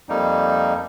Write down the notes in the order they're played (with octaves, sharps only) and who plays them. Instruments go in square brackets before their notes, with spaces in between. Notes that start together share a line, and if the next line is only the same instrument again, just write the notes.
[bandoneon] F2 G3 A#3 D#4